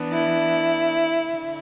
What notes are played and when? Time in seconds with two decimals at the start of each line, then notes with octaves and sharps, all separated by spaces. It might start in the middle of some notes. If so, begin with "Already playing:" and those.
Already playing: E3 B3 D4
0.11 E4
1.30 D3